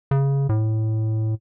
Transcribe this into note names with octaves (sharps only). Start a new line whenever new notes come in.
C#3
A2